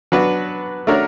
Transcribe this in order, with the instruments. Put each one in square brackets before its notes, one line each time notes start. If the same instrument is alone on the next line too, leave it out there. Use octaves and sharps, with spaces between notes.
[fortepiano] F#3 B3 D4 F#4 B4
A3 D4 F#4 A#4 C#5